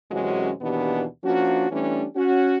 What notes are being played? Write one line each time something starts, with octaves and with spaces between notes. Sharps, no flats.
F#2 C3 E3 G#3 C#4 F#4
D#2 B2 E3 B3 D4 G4
F3 A#3 C#4 D4 F#4
E3 G3 A3 C#4 D4
C#4 F#4